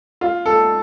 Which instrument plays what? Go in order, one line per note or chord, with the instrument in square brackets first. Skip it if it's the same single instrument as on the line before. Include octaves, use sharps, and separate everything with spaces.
[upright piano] F4
A4